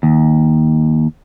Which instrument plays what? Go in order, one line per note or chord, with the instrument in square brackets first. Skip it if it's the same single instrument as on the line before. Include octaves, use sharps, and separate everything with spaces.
[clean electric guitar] D#2